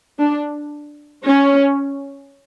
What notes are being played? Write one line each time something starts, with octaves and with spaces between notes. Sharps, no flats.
D4
C#4